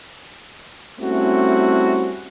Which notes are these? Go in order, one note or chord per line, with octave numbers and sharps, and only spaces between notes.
G3 A3 C4 C#4 E4 F#4